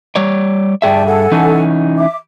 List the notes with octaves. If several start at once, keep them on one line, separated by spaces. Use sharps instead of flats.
G3 C#5 D5
G2 G#4 D5 E5 G5 A5
A4 F#5 G#5
E3 C#4 D#4
E5 D6